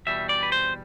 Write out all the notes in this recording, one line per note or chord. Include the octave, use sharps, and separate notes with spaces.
E2 B2 G3 E5
D5
B4
C5